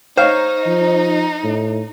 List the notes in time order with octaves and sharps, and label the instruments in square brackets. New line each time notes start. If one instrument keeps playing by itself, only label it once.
[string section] D#4 [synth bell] C5 [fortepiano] C#5 F5
[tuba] F3
A2